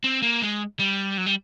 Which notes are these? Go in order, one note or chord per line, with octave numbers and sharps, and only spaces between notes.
C4
A#3
G#3
G3
F#3
G3